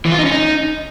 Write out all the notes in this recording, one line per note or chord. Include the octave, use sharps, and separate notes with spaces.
E3
F4
D#4
C#4
D#4